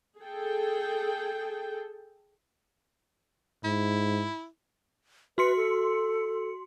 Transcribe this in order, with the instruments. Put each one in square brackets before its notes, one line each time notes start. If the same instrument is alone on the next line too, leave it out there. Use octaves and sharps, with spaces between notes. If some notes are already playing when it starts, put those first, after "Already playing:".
[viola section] G#4 A4 G5
[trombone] G#2 [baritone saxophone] E4
[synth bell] F#4 C6 C#7 [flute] B4
[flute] A4